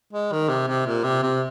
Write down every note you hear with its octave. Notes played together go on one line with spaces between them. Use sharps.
G#3
D#3
C3
C3
A#2
C3
C3